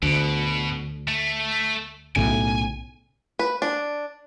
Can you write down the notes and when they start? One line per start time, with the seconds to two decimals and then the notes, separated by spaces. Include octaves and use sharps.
0.02 D2 B2
1.08 A3
2.16 B1 A2 C#3 G#5
3.39 B4
3.62 D4